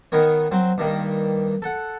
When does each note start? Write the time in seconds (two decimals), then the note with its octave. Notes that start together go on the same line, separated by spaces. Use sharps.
0.12 D#3 B3 A#4 C#5
0.51 F#3 C4
0.78 G2 D#3 A#3
1.62 A4 F#5